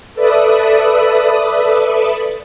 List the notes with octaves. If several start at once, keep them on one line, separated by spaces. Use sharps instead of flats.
A4 B4 D5 E5 B5 D#6